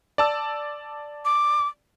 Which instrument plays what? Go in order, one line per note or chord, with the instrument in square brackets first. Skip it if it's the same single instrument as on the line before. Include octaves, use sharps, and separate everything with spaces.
[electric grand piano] D5 A5 E6
[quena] D6